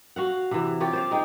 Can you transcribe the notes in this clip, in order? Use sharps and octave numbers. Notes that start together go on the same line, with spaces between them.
F#4 F5 F#5
C3 E3
F4 G4 C#5 D5
C5 D5 F5
G#3 D#4 G5